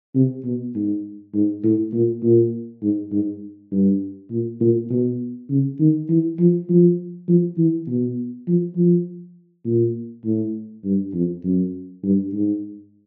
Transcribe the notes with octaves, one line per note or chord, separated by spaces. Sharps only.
C3
B2
G#2
G#2
A2
A#2
A#2
G#2
G#2
G2
A#2
A#2
B2
C#3
D#3
E3
F3
F3
F3
E3
B2
F3
F3
A#2
A2
G2
F2
F#2
G2
G#2